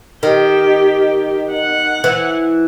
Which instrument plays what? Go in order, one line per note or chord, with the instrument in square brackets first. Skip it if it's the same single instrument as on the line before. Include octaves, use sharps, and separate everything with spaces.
[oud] D#3 [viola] G4
[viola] F#5
[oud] E3